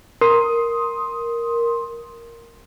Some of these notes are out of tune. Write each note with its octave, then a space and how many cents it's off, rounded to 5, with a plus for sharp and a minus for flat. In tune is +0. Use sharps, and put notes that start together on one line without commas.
A#4 +0 C6 +10 D#6 +10